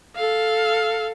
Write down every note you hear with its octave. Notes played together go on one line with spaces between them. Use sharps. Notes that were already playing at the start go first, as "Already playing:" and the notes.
A4 F5